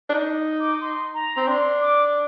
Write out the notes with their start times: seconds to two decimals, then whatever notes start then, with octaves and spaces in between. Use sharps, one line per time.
0.10 D4
0.14 D#4
0.36 D#6
0.59 D6
0.81 C6
1.15 A#5
1.37 C4
1.48 D4 C6
1.82 D6